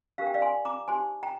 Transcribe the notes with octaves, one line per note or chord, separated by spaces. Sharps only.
D4 G4 A#4 F5
G5
D5 F5
G#5 C6
A#5 D6
D#4 G4 C5 G#5 C6
G5 A#5